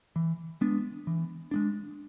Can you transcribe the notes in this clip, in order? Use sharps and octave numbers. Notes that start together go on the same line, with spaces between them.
E3
G#3 B3 D4
E3
G#3 B3 D4